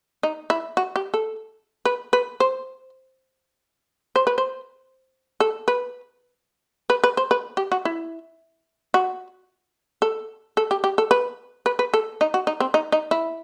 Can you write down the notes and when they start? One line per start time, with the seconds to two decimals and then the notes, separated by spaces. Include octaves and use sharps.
0.23 D#4
0.50 E4
0.77 F#4
0.96 G4
1.14 A4
1.85 B4
2.13 B4
2.40 C5
4.16 C5
4.27 B4
4.38 C5
5.40 A4
5.68 B4
6.90 B4
7.04 B4
7.17 C5
7.31 B4
7.57 G4
7.72 F#4
7.85 E4
8.94 F#4
10.02 A4
10.57 A4
10.71 G4
10.84 G4
10.98 A4
11.11 B4
11.66 B4
11.79 B4
11.94 A4
12.21 D#4
12.34 F#4
12.47 D#4
12.60 C4
12.74 D#4
12.92 D#4
13.11 E4